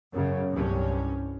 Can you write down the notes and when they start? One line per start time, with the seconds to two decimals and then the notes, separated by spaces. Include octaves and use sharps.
0.12 F#2 C#3
0.51 C2 G2 C#4